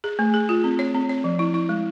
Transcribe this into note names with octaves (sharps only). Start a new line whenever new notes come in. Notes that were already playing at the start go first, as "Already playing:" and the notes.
G#4
A3
G#4
F4
C4
C#5
C4
C#5
F3
E4
E4
G#3